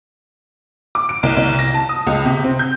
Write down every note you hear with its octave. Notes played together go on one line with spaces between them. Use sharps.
D6
D7
C2
C2
A#6
A5
D#6
C#2
C3
C4
G6